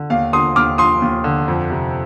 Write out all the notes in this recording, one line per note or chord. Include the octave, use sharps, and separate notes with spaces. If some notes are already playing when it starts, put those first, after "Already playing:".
Already playing: D3
D#2 F5
D3 C6 D#6
D#2 D6 F6
F3 C6 D#6
D#2
D3
F2
C3